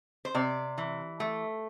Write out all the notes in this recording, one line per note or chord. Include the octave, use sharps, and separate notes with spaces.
C5
C3 D5
E3
A3